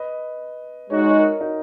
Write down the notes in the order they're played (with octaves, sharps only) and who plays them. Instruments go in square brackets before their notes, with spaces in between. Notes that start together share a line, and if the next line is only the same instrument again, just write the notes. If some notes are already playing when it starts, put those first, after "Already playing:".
Already playing: [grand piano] B4 D#5
[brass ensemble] G#3 D#4 F#4 [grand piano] C#5
[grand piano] D#5
C#5
D#5
A#4 C#5
D#4 F#4